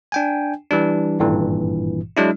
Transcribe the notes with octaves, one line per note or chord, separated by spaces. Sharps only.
D4 G5 G#5
E3 G3 D4
G#1 G2 A#2 E3
F#3 G#3 D4 E4